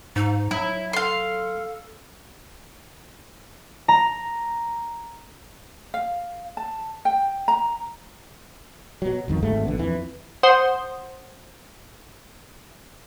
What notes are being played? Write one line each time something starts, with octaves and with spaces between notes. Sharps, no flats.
G#2 D#4
F#3 E4
A4 F5 C6
A#5
F5
A5
G5
A#5
B2 F#3
G1 F2 D#3
G#1 G#2 G#3 A3
A#1 D3 B3
F2 E3
C5 F#5 C6 D#6